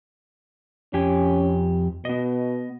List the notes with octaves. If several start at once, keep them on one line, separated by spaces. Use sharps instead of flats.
F2 C#4 G4 G#5
B2 B3 D#5